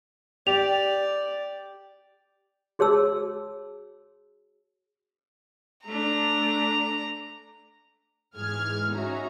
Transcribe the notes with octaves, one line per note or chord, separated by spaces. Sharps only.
G4 D5 F7
F#4 G#4 C#5 A5 E6
A3 D4 A#5
G#2 E3 G#4 F6 G#6
C#4 D#4 F#4 E5 A#5